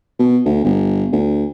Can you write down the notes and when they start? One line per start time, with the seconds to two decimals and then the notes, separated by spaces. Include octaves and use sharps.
0.19 B2
0.45 D2
0.64 G1
1.12 D2